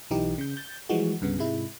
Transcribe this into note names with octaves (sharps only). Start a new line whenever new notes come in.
B1 E3 D#4 G4
C#3 G6
G6 A6
E3 F3 G3 G#3 F#4
C2 G2 C#3 B3
G#2 C3 G#3 E4